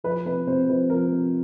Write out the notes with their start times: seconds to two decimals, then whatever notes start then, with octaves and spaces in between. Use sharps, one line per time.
0.04 F3 B4
0.25 C3 B4
0.47 C3 C5
0.69 F3 B4
0.90 F3 A#4
1.11 C3